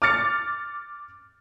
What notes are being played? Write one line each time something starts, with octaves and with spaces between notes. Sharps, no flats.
D6 F6 A6 C#7